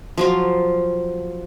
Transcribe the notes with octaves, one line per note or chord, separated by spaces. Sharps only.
F3 F#3 F4